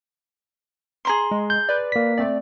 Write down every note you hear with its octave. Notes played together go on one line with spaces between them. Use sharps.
G#4 A#5 C6
G#3
G6
B4 D5
A#3 B6
A3 C4 D5